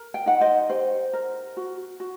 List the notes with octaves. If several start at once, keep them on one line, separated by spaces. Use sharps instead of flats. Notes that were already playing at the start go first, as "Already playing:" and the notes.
Already playing: A#4
G5
D#4 F#5
C5 D#5
G4 C5
A#4
F#4
F#4